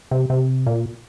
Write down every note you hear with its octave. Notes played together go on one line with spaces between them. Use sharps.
C3
C3
A#2